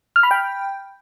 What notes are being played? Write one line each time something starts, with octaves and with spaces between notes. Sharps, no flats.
F6
B5
G5